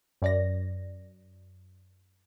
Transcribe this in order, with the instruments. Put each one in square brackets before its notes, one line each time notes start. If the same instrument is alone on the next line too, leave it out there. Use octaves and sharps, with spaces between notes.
[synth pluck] F#2 D5 A#6